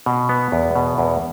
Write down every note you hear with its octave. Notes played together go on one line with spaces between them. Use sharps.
B2
B3
E2
B2
E2